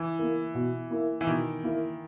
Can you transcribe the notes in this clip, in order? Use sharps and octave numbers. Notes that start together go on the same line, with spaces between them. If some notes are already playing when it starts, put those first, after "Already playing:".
Already playing: E3
A#3 E4 A#4
B2
A#3 E4 A#4
E3
B2 D#3
A#3 E4 A#4